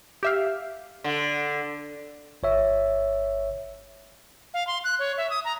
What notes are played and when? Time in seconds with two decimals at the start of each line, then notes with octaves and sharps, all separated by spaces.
0.23 G4 E5 F5
1.04 D3
2.43 G1 C#5 E5
4.54 F5
4.67 C6
4.84 F#6
4.99 C#5
5.18 E5
5.30 D#6
5.45 A#5